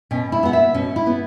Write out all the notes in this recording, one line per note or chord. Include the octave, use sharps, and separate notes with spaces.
B2 C#4
E4
B3 F#5
E5
B2 C#4
E4
B3